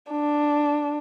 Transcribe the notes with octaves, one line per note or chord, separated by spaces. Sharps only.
D4